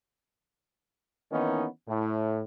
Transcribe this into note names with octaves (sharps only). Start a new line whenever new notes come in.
D#3 E3 A#3 B3 C#4 D#4
A2